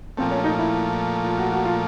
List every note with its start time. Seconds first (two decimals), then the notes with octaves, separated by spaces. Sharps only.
0.17 A#2 F3 A3 C4
0.31 C#4
0.44 D#4
0.59 E4
1.24 F4
1.38 F#4
1.52 F#4
1.65 F4